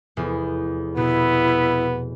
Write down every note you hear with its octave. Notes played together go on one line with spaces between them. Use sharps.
F1 E2
B2 B3 E4